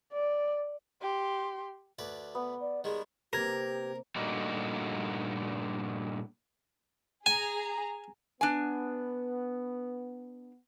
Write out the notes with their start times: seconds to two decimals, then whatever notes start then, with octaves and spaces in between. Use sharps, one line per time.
0.13 D5
1.01 G4 C6
1.99 D2 B4 D5
2.35 B3
2.60 D5
2.84 D#3 G3 G#3 G#4
3.33 C3 A#3 G4 A#4 B4 G#6
4.16 G2 A#2 A3 A#3 D#4 F#4
7.26 G#4 G#5 A#5
8.41 B3 D4 G#5